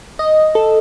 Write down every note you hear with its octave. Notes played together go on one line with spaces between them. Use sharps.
D#5
A4